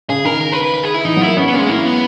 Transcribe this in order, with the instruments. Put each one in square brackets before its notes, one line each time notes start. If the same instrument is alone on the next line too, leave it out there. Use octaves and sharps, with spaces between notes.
[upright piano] C#3 [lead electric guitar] G#4
[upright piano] D#3 [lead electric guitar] A#4
[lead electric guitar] A#4
B4
B4
B4
G#4
E4
[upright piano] E3 [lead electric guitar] D#4
[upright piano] F#3
[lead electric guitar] E4
[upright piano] A#3
[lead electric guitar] B3 [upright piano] C#4
[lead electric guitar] B3
[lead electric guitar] A#3 [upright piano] C#4
[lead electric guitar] G#3
[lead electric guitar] A#3 [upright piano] E4
[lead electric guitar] B3